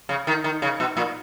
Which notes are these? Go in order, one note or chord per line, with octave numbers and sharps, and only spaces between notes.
C#3
D#3
D#3
C#3
B2
A#2